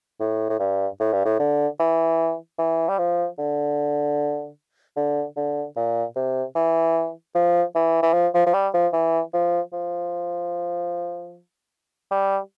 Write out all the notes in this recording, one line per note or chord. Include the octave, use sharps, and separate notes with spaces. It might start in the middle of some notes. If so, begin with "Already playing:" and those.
A2
A2
G2
A2
G2
A2
D3
E3
E3
G3
F3
D3
D3
D3
A#2
C3
E3
F3
E3
E3
F3
F3
F3
G3
F3
E3
F3
F3
G3